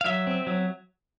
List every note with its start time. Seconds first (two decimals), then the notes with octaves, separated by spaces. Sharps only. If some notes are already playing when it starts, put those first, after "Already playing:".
0.01 F5
0.06 F#3 E5
0.27 C4
0.47 F#3